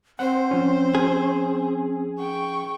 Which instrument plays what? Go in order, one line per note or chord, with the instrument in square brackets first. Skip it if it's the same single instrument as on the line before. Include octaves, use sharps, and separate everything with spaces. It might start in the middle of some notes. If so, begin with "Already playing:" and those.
[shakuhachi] C4 [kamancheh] C5 [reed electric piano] F#5
[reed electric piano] F3 C#4
[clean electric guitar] G#4
[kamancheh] G5 C#6